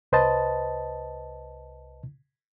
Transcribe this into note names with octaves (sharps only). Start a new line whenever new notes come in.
C2 B4 C5 D#5 A5